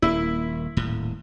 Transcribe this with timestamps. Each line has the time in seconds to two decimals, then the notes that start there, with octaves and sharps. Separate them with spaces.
0.02 D#1 A#3 E4
0.77 D#1 A2